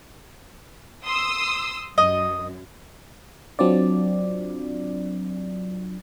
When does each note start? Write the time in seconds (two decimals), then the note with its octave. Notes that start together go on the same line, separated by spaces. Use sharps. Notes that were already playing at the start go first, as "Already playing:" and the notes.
1.06 C6 D#6 E6
1.98 F#2 D#5
3.59 F#3 C4 D4 F4 D5